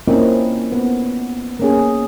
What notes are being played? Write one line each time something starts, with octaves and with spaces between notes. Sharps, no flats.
A#3 C4 C#4 E4 F4 D#5
B3
A#3 C#4 G#4